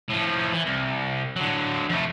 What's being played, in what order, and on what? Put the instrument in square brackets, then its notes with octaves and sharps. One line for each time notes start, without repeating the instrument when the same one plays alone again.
[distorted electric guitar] A2 F3
E3
C2
D3 F#3
F2 A3